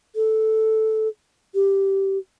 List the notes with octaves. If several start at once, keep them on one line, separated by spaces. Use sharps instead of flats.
A4
G4